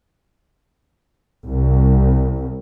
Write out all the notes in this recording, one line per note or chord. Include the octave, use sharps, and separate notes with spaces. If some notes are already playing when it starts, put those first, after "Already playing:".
C2